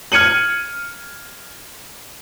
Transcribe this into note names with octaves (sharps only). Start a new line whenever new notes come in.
F6 G#6 C#7 D#7 F#7